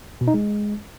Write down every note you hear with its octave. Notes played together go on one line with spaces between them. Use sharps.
B2
D#4
G#3